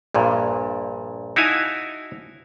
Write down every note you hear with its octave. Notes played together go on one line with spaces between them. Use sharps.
A#1 G2 A#2
D#4 E4 F#4 F5 G#5 A5